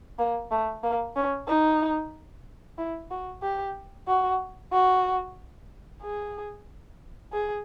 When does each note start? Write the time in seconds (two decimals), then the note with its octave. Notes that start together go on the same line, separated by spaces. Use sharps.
0.19 A#3
0.51 A3
0.84 A#3
1.16 C#4
1.48 D#4
2.78 E4
3.11 F#4
3.43 G4
4.08 F#4
4.73 F#4
6.02 G#4
7.32 G#4